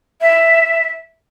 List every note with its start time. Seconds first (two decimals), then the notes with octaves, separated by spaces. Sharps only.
0.21 E5